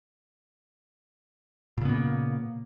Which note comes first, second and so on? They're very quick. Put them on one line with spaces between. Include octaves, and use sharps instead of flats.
A#2 C#3 B3 A#3